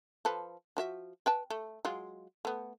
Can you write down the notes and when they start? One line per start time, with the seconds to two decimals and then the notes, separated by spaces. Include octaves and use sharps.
0.25 F3 A4 B4
0.77 F3 F#4 E5
1.26 B4 G5 A5
1.50 A3
1.85 F#3 G#3 F4
2.45 A3 B3